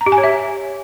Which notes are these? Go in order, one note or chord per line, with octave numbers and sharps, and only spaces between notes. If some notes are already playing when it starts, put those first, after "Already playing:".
A#5
G4
G#5
C#5
E5